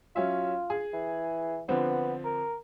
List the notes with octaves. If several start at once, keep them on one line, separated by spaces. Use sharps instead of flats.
F#3 C#4 F4 E5
G#4
E3
D3 F3 B3 C4
A#4